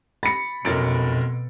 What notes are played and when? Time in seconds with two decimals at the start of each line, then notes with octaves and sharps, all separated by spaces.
0.23 B5 A6 A#6 C#7
0.65 F1 F#2 B2 A#4 A6 D7